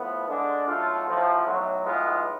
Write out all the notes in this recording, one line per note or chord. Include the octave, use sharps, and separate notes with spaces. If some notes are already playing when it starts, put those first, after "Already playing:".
Already playing: A2 F3 B3
D3 G#3 D4
B1 B2 A3 F4
A1 A2 F3
B1 A2 F#3
B1 A2 G#3 B3 F4